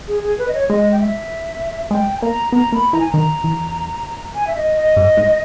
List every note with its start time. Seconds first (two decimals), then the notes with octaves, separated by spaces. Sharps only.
0.08 G#4
0.23 G#4
0.39 B4
0.48 D#5
0.54 C#5
0.69 G#3 D#5
0.92 G5
1.00 E5
1.91 G#3 G5
2.17 G#5
2.22 A#3 A#5
2.52 B3 A#5
2.72 A#3 B5
2.93 E3 A#5
3.00 G#5
3.09 D#3 A#5
3.44 E2
4.35 G#5
4.47 E5
4.56 D#5
4.76 D#5
4.97 G2
5.17 G#2